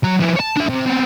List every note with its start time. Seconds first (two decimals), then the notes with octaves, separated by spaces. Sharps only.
0.04 F#3 F#4
0.20 F3 E4
0.37 C#5 A5
0.57 D4 E5
0.69 C3
0.86 B3 C4